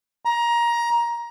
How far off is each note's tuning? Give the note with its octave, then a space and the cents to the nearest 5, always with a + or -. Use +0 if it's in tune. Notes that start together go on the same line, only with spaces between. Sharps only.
A#5 +20